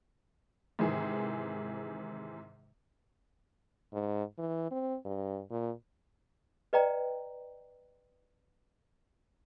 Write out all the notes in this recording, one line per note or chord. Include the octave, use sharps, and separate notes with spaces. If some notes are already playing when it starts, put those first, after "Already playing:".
G#2 C3 D#3 E3 G#4
G#2
E3
C4
G2
A#2
B4 D5 D#5 G5 A#5